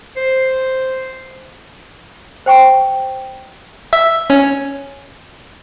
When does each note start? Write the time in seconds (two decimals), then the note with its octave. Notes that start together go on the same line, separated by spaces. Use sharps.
0.17 C5
2.46 C5 G5 C#6
3.93 E5
4.30 C#4